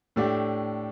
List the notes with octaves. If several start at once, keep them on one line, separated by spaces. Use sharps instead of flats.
A2 A3 D4 G4